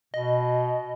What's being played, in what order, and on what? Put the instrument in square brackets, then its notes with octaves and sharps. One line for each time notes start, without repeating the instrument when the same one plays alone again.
[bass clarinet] B2 [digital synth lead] D#5